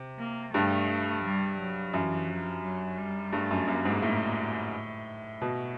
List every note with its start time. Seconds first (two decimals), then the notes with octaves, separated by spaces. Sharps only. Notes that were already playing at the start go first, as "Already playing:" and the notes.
Already playing: C3
0.19 A#3
0.53 G2 A3
1.24 G3
1.59 F#3
1.93 F#2 E3
2.28 F3
2.63 F#3
2.98 G3
3.33 G2 A3
3.51 F#2
3.67 F#2 A#3
3.85 G#2
4.02 A2
5.41 B2